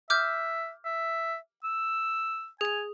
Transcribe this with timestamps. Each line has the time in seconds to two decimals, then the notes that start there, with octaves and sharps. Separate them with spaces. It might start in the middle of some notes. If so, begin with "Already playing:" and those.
0.10 E5 D6 F6 G6
0.85 E5
1.64 E6
2.61 G#4 G#5 F7